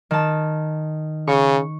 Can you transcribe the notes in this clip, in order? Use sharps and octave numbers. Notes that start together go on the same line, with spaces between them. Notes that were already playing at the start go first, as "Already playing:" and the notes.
D#3 A5
C#3 C#6